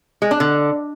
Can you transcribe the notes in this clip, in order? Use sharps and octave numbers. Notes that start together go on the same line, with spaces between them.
G#3
D4
D3